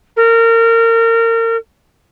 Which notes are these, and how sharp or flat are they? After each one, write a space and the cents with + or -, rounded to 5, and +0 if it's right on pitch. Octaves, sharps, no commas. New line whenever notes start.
A#4 -30